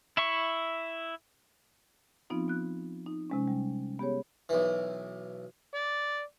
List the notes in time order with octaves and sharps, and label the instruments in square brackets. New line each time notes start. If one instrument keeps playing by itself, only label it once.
[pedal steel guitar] E4 E5 C#6
[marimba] F3 B3 C4 D#4 F4
B3 F4 F#6
D#4
C3 G#3 C#4
G3
B3 G4 G#4 C#5
[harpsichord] B1 E3
[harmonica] D5